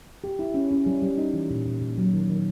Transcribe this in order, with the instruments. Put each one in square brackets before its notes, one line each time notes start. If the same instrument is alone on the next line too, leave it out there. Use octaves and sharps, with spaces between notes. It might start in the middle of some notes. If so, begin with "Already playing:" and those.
[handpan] G4
E4
C#4
C#4
G3
G3
D#4
E3
A#2
A#2
A#2
F#3
D#3
D#3